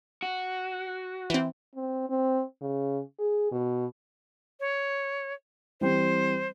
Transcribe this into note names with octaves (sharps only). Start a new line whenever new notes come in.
F#4
E3 C4
C4
C4
C#3
G#4
B2
C#5
E3 G3 C4 C5